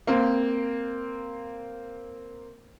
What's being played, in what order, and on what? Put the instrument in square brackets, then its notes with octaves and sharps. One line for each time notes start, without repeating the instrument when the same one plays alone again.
[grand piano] A#3 C4